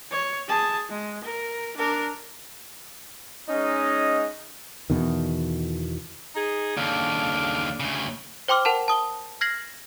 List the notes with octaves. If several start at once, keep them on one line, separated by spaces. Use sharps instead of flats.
C#5
G#4 A5
G#3
A#4
D4 A#4
G#3 C#4 D#4 D#5
E2 B2 D#3
D#4 G#4
D#2 C#3 D4 A4 F5
D2 C#3
C5 G5 C6 D6 F6
A#4 F#5 A5 E7
A5 D#6 G7
F6 G#6 A#6 C7 F#7